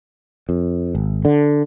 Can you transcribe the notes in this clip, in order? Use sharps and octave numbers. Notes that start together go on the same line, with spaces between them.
F2
G#1
D3